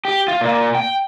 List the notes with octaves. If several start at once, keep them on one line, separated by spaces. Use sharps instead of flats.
G4
F4
A#2
G5